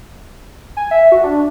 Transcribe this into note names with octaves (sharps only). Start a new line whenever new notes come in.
G#5
E5
F#4
D4